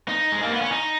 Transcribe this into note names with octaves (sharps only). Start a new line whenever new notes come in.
D#4
G#3
A#3
B3
C#4
D#4